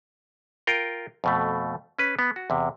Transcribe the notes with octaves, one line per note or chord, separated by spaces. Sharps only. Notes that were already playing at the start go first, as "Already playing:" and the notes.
F4 A#4 G5
F2 B2 A3
C#4 B4
B3
F#4
E2 C3